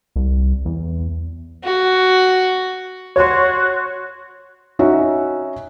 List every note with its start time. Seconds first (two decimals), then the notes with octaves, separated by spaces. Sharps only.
0.16 C2
0.65 E2
1.64 F#4
3.16 F#4 C#5 C6
4.79 C#4 D#4 F#4 E5